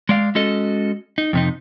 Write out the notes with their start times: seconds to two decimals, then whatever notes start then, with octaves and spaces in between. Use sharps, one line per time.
0.09 G#3 D5 F5
0.35 G#3 C#4 F#4 A4 D#5
1.18 D#4
1.33 F2 C3 D#4